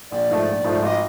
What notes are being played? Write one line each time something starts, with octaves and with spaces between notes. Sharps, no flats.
A#1 D5
G#2 F3 A3
A#1
G#2 F3 A3
G#1 D#5